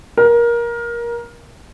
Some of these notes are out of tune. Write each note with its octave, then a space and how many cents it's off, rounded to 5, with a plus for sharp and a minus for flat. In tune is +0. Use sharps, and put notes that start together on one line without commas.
A#4 +20